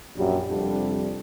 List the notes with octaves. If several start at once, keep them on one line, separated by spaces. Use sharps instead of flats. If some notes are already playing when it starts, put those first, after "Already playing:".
A#1 F#2 G3
F2 C3 G3 D4